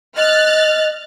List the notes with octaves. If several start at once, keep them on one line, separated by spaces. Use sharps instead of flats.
D#5 F6 F#6 A6